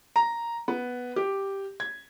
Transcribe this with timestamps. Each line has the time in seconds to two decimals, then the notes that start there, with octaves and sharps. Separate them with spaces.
0.16 A#5
0.68 B3
1.16 G4
1.80 G#6